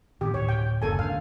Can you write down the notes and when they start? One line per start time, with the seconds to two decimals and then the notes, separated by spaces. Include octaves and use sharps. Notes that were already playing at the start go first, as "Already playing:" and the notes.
0.21 A2 D#3 B3 G4
0.34 D2 A2 C#5
0.49 G5
0.82 F#1 D2 C#3 A#3 A4 G#5
0.99 G#2 D3 F5